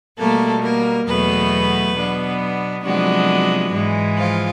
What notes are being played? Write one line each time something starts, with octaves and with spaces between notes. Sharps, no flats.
B2 G3 A3 A#3 A4
A#3 A#4
E2 B2 F#3 A3 B3 B4
B2 F#3 B3 D4
C3 F3 F#3 G#3 B3 D4 F#4
G#2 E3 G#3
F3 F4